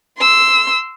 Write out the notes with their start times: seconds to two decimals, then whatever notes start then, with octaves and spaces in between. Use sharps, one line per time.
0.18 C6 E6